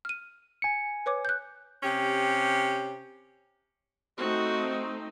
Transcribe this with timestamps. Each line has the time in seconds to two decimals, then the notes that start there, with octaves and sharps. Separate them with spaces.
0.05 F6 D#7
0.62 G#5 C#7
1.06 B4 C#5 D6
1.25 F#6 G6
1.83 C3 C#4 G4
4.18 A3 C4 D#4 F#4